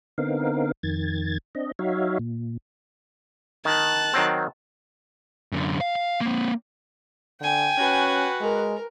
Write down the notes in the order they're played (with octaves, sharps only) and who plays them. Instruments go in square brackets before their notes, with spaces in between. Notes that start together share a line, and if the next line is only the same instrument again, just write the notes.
[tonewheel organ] D3 B3 C4 D#4 A#4 F5
F2 D#3 G#6 A6
C4 D4 D#5
F#3 D#4 F#4 C#5 E5 F5
A#2
[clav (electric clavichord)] D#3 [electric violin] A5 F#6
[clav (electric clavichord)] D#3 F#3 C4
[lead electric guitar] F#2 D3
F5
F5
A#3 C4
[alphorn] D3 [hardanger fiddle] G5 G#5
[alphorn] C#4 [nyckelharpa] F#4 B4
[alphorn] G#3 [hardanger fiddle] A#4